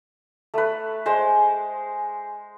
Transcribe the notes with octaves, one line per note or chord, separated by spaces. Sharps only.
A3 B4
G#3 C5